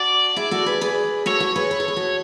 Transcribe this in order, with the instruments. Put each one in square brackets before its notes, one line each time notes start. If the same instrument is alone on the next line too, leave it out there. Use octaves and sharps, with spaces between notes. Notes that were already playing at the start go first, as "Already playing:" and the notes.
Already playing: [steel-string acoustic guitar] D4 F#4 [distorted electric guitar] D5
[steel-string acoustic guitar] E4 G#4
F#4 A4
G#4 B4
G#4 B4
[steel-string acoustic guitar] F#4 A4 [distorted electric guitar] C#5
[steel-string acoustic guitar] F#4 A4
G#4 B4
B4
A4
G#4
F#4 A4